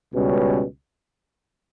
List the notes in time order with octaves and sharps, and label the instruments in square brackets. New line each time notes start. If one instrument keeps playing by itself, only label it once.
[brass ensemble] C#2 B2 G3 C#4